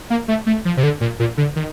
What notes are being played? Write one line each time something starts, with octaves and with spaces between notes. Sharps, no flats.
A#3
A3
A3
F3
C3
D3
A#2
A#2
D3
D#3